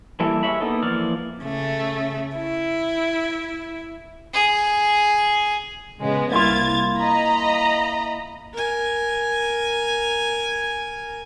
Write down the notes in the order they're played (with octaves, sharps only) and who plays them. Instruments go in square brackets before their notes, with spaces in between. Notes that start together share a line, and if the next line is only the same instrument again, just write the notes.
[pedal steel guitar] E3 G3 A#3 E4 A4
G#3 C#5 E5 B5
A#3 B3 D#4 A4
E3 F3 A#3 D5 F6
[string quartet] C#3 A3
E4
[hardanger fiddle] G#4
[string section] C#3 G#3 B3
[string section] C2 G#6 A6 [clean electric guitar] A#3 E4 F4
[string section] D#5 A#5 B5
[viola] A#4 G#5